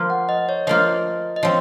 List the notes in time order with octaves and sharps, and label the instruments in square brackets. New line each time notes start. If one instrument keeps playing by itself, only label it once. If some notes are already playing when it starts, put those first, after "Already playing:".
Already playing: [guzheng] F3 A#3 F4
[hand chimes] F#5
D#5
C#5
[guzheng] F3 A#3 F4 [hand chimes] D#5
[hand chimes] D#5
[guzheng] F3 C4 [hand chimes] C#5